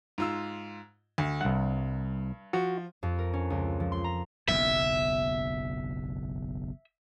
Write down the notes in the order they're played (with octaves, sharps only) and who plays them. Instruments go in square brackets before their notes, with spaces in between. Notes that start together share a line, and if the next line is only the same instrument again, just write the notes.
[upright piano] G#2 F4 E6
D2
[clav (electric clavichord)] C2 F#5 [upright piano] G2
[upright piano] F3 [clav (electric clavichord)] F#4
[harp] F2
A#4
C#4
C#2
F3
C6
A#5
[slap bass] F#1 B1 E2 [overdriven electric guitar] E5